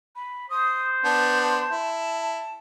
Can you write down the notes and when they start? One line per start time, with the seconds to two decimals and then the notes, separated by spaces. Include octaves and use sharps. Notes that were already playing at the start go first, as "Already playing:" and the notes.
0.16 B5
0.50 C5 D#6
1.04 B3 D4 A5
1.42 A5
1.71 E4